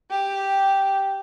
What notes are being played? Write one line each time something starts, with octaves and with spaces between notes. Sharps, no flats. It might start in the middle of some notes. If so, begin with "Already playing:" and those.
G4